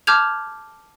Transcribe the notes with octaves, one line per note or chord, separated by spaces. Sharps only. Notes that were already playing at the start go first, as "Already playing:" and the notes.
A5 D6 F6 G6 G#6 F7